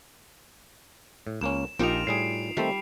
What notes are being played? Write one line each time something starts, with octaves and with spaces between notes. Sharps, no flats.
A2
C#2 A#3 C#4 E7
A#1 D#4 F4 G4 A#4 D#5 D7 F7
A2 G3 G#4 C7 D7
D#3 G3 A3 C4